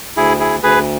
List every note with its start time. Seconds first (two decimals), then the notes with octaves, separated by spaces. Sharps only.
0.17 D2 E4 G#4
0.40 E4 G#4
0.63 D2 G#4 B4